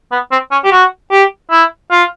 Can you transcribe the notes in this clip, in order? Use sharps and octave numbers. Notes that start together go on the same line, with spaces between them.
B3
C4
C#4
G4
F#4
G4
E4
F4